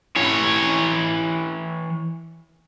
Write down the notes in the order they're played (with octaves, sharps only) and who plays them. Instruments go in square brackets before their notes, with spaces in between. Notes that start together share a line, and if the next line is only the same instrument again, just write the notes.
[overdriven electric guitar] E3 C#5